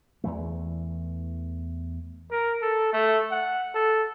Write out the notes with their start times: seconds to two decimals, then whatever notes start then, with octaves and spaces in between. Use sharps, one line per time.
0.24 E2 E3 A3
2.31 A#4
2.62 A4
2.93 A3
3.31 F#5
3.74 A4